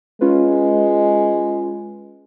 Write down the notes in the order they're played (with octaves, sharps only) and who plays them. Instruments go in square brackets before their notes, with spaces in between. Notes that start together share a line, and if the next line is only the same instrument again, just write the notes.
[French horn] G#3 [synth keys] C#4 F4 B4